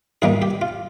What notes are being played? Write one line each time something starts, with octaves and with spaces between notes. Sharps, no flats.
G#2 E3 G3 A#3 D#4 G#4
G4
F4